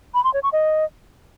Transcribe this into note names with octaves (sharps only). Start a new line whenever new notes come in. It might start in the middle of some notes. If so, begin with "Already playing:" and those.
B5
C6
C#5
C#6
D#5